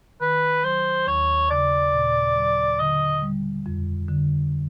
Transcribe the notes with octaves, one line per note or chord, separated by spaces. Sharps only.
D#3 B4
F#3 C5
D#2 C#5
C#3 D5
A#2
F#3
D3 D#5
G3
F2
D3